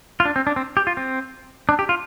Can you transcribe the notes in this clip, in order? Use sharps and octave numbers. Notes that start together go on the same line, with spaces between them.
F4
D4
C4
D4
C4
G4
F4
C4
D4
G4
F4